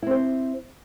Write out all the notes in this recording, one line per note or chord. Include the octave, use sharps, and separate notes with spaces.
C4 E4 C5